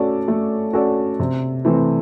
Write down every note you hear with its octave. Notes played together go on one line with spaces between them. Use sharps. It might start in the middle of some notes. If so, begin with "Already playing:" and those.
Already playing: A3 C#4 F#4 A4 D5
A3
C#4 F#4 A4 D5
C3
E3 A3 C4